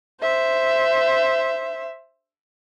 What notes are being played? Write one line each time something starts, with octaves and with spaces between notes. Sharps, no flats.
C5 E5